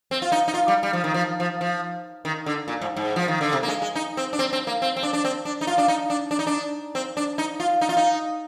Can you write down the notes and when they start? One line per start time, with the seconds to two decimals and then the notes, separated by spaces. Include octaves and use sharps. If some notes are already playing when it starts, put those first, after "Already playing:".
0.11 C4
0.22 F4
0.32 D#4
0.48 D#4
0.54 F4
0.68 G3
0.83 G3
0.93 F3
1.04 D#3
1.14 F3
1.40 F3
1.61 F3
2.25 D#3
2.46 D3
2.68 A#2
2.81 G#2
2.97 G#2
3.16 F3
3.28 D#3
3.41 D3
3.53 C3
3.63 A#3
3.68 G#3
3.82 G#3
3.95 D#4
4.17 C4
4.33 D4
4.39 C4
4.53 C4
4.67 A#3
4.82 C4
4.97 C4
5.03 D4
5.13 D4
5.25 C4
5.45 D4
5.61 D#4
5.67 F4
5.78 D4
5.88 D#4
6.10 D4
6.31 D4
6.39 D#4
6.47 D4
6.95 C4
7.17 D4
7.38 D#4
7.60 F4
7.81 D#4
7.89 F4
7.97 D#4